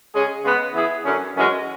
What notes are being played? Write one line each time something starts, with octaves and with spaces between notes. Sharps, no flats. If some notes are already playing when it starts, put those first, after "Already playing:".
C#3 G#3 C#4 G#4
C#3 G#3 B3
E3 B3 E4 G#4
F#2 D3 F#3 C#4
F#2 E3 G#3 C#4 F#4